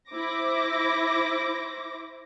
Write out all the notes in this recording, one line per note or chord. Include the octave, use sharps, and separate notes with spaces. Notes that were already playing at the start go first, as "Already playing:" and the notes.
E4 C5 D6 A#6